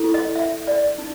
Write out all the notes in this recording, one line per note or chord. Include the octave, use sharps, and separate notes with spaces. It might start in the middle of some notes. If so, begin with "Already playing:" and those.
Already playing: E4 A4
D#5
E5
D5
D#4